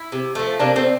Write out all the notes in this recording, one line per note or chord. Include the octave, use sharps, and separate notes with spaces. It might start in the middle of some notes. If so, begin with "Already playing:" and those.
Already playing: E4
C3
F3 A3
C3 A#3 D4
A3 C4